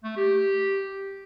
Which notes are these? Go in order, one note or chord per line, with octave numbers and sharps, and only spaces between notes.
A3
G4